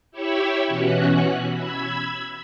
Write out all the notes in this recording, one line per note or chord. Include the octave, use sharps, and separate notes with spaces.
E4 G4 C#5 B5 C#6 E6
B2 E3 C#4 F#4 F#6
B5 E6 G#6